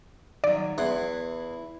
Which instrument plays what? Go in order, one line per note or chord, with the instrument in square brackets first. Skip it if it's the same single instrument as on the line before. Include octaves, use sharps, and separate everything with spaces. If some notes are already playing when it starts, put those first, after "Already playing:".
[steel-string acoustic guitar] D#3 F#3 [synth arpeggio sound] D5
[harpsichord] E2 F#5 C6 [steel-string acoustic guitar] E4